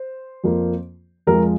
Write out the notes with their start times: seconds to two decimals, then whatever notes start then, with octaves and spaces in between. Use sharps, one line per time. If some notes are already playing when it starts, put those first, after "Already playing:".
Already playing: C5
0.44 F2 F3 A#3
1.27 F2 F3 G#3 A#4